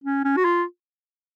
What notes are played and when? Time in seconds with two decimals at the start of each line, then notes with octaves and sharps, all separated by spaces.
0.04 C#4
0.24 C#4
0.37 F#4
0.45 F4